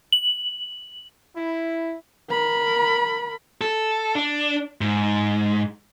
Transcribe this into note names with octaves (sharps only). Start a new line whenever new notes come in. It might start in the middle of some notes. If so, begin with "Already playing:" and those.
F#7
E4
A#4 B5
A4
D4
G#2